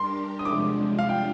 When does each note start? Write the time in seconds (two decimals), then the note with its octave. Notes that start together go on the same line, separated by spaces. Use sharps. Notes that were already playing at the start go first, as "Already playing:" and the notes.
Already playing: G3 D4 G4 A#4 C6
0.39 D#6
0.45 C3 F3 G#3 D4 D6
0.99 G3 D4 F4 F5
1.09 G5